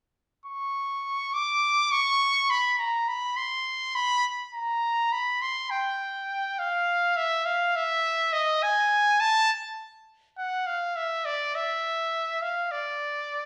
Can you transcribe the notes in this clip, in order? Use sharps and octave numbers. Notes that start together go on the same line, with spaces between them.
C#6
D6
C#6
B5
A#5
B5
C6
B5
A#5
B5
C6
G5
F5
E5
F5
E5
D#5
G#5
A5
F#5
F5
E5
D5
E5
F5
D5